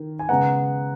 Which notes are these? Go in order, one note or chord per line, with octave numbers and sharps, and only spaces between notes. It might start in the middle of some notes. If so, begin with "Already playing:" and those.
Already playing: D#3
G#5
C#3 G#3 B3 F#5 A#5